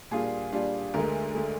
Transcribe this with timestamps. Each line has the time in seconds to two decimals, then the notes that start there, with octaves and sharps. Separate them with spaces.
0.11 A#2 G3 D4 F4 G#4
0.53 A#2 G3 D4 F4
0.94 D2 D3 G#3 A#4
1.35 D3 G#3